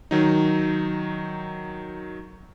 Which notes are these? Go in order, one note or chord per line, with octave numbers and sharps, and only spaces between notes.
D#3 F#3 D#4